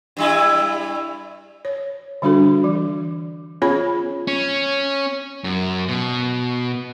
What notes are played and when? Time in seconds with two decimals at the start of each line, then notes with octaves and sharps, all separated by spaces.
0.17 G2 G3 E4
1.65 C#5
2.22 D3 G3 D4 F#4 A4
2.64 E3
3.62 B3 C#4 F4 G#4 C#5 B5
4.27 C#4
5.44 F#2
5.89 B2